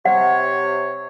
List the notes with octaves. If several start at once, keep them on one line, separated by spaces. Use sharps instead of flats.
C3 C#5 F#5